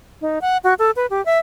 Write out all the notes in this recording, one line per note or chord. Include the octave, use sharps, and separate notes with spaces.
D#4
F#5
F#4
A4
B4
G4
E5